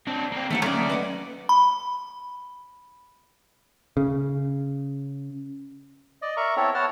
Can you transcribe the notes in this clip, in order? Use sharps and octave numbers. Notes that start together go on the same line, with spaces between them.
C4 D4
A#3 C4
D#2 A3 A#3 F#5
F#3 A3 C#4 D5
B4 D#5 F#5
B5
C#3
D5 D#5
A#4 E5 A#5 C#6
B3 C4 E4 A4 C#5
B3 C#5 F#5 A5 F6